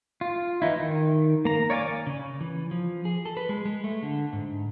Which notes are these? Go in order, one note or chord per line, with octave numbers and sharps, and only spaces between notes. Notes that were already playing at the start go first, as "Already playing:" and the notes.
F4
E3 D#4 E4
D#3
A#3 A#5
C#5 D5 F5 G#5 D6
C#3
E3
F3
G#4
A4
B4
G#3
G#3
A3
D3
G#2